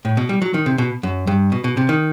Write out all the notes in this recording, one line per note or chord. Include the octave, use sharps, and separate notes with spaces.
A2
B2
G3
F#3
D#3
C3
B2
F#2
G2
B2
B2
C3
D#3